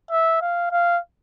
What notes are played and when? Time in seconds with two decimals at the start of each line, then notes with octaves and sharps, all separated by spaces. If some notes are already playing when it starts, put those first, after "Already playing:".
0.11 E5
0.41 F5
0.72 F5